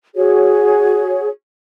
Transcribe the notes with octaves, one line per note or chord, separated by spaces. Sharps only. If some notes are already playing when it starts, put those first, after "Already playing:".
F#4 G#4 C#5